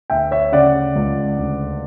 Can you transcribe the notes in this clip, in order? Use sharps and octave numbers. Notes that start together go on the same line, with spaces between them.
D2 E5 G5
C#5 E5
C#3 D5 F#5
C#2
D2